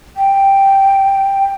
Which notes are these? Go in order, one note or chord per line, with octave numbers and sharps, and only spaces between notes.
G5